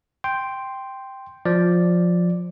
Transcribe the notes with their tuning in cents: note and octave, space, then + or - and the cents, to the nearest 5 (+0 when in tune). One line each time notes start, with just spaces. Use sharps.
G5 +0 C6 +0
F3 +15 D5 +0